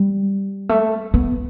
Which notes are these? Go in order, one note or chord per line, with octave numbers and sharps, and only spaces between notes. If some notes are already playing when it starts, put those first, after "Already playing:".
Already playing: G3
A3
B3